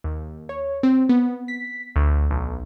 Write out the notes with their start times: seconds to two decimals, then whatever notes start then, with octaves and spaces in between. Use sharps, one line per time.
0.04 D#2
0.49 C#5
0.83 C4
1.09 B3
1.48 B6
1.96 D2
2.31 B1